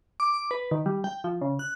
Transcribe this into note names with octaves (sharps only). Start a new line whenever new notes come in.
D6
D6
B4
D#3
G3
G5
F3
C#3
F#6